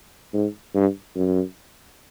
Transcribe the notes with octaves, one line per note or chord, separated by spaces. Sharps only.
G#2
G2
F#2